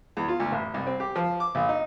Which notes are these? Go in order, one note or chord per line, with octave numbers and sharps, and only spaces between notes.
E2
F4
D2
A1
C2
C4
G4
F3
D6
A#1
D#4